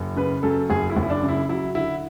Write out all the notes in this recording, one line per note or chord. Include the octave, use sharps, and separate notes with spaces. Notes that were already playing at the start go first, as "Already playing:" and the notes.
Already playing: F#1
C#3 B4
F#2 A4
F#1 G#4
E4
F#1
E4
D4
C#3
E4
F#3 E4
D3 E4